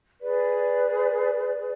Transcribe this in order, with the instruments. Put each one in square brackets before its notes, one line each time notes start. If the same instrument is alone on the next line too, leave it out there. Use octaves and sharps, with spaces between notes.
[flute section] G#4 B4 D5